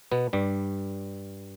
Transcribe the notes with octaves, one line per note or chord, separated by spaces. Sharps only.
B2 B3
G2 G3